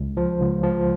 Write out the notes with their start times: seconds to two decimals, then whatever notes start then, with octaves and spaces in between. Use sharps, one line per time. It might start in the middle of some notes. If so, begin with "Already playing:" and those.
Already playing: C#2
0.17 F3
0.41 C#2
0.63 F3